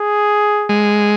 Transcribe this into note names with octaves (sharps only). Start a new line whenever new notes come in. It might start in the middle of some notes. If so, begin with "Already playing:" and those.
Already playing: G#4
G#3